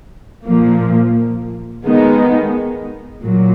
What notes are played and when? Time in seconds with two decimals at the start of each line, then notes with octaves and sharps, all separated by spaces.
0.46 A#2 F3 A#3
1.84 D#3 G#3 B3 D#4
3.24 A#2 F#3